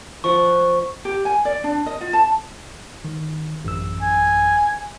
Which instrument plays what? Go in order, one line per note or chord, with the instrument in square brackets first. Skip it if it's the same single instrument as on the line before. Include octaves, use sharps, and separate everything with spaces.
[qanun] F3 F#5 [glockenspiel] C#6
[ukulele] G4
G#5
D5
D4
D#5
F4
A5
[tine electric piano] D#3
A1 F#2 E6
[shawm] G#5